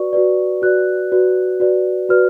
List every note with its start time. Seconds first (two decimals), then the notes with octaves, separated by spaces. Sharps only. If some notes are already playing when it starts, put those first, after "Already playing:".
Already playing: F#4 B4 D5 C#6
0.13 F#4 B4 D5
0.62 F#4 B4 D5 F#6
1.12 F#4 B4 D5
1.60 F#4 B4 D5
2.09 F#4 B4 D5 F6